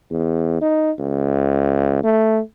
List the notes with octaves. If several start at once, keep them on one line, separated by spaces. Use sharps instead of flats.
E2
D#4
C#2
A3